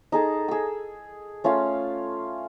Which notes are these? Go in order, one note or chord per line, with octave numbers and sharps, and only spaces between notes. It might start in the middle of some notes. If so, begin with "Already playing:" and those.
D#4 G#4 A4
G#4 E6
A3 C#4 F4 F5